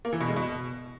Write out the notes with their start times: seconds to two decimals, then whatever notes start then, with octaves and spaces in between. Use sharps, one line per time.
0.05 A#3
0.13 E3
0.20 B2
0.28 G#3
0.36 B2